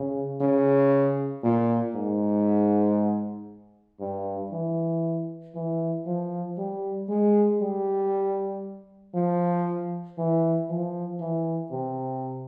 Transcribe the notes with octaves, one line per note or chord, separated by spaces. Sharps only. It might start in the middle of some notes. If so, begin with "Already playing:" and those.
Already playing: C#3
C#3
A#2
G#2
G2
E3
E3
F3
G3
G#3
G3
F3
E3
F3
E3
C3